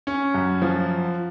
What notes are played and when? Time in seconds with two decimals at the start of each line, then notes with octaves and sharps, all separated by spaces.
0.07 C#4
0.34 F#2
0.62 F3